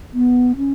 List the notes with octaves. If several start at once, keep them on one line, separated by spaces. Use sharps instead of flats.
B3
C#4